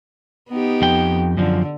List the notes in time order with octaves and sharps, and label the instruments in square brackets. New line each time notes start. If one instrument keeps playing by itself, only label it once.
[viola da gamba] B3 D#4 G4
[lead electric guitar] F2 G5
[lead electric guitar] F#2 F3 [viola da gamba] D3